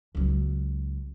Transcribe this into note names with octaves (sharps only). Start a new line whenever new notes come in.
C#2 F#3